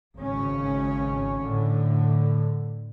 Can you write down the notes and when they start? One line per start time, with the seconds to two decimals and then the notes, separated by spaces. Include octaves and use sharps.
0.16 G#1 C#3 C#4
1.42 A2 D3